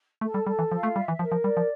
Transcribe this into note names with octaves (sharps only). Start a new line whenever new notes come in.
A3 A4
G3
G3 A4
E3
F3 F4
A3
G3 E5
E3
F3 A#4
F3
G3 D5
F3